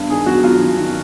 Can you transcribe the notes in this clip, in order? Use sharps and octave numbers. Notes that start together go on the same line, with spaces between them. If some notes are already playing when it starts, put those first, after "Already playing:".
Already playing: G2
D#3 G#4
F#2 F#4
F#2 F4
D#3
D#3